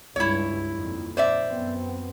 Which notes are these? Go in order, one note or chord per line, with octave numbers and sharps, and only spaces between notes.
C#2 G2 E4 C#5
F2 A#2 D#3
C5 D5 E5
F#2 B3 C4